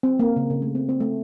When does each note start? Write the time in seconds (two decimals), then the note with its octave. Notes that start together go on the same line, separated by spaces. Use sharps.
0.03 C4
0.19 A#3
0.36 C#3
0.50 C#3
0.62 A3
0.75 C4
0.89 C4
1.00 A3